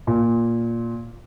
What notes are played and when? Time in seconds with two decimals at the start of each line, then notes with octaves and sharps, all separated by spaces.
0.07 A#2